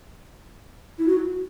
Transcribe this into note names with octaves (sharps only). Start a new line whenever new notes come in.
E4
F#4